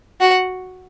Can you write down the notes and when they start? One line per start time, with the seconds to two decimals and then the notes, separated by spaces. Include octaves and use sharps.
0.20 F#4 F#5